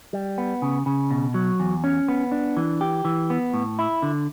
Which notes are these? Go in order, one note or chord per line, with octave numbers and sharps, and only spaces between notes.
G3
B3
C#3
C#3
B2
F#3
E2
C#4
B3
D4
E3
G4
E3
B3
A2
E4
D3